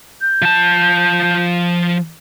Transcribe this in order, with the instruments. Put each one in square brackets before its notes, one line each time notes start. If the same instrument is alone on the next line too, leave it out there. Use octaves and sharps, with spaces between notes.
[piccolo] G6
[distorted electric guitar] F3 A5